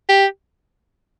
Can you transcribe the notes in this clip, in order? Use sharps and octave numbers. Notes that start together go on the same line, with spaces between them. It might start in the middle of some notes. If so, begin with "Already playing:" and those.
G4